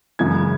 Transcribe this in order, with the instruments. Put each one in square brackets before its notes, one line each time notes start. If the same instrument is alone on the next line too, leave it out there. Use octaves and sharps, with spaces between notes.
[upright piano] F#2 C#3 E3 G#3 G#6